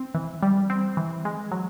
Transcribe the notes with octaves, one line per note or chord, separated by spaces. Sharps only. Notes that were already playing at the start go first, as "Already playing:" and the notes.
Already playing: C4
E3
G3
C4
E3
G#3
F#3